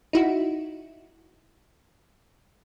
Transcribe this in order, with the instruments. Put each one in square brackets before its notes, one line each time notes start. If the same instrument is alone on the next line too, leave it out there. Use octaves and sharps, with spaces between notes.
[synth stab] D#4 E4 F#4